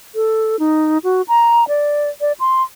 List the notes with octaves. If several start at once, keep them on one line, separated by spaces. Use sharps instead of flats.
A4
D#4
F#4
A#5
D5
D5
C6